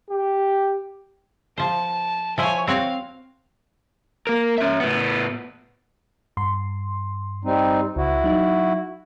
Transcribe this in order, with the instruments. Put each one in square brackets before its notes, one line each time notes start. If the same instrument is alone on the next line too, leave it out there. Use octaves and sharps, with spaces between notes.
[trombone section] G4
[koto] F3 C5 [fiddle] A5
[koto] F3 E4 C5 [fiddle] C#5 G#5
[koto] C4 F#4 C#5 [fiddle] F5
[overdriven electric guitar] A#3 A#4
C#4 E5
A2 B3
[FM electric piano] G2 C6
[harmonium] G3 C4 D#4
[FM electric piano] C#2 [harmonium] E4 F#4
[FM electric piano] F#3 D#4